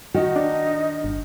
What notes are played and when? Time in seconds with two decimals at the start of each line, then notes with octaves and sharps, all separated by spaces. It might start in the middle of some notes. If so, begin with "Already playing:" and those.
0.14 D#3 D#4 F#4
0.36 D4
1.04 G1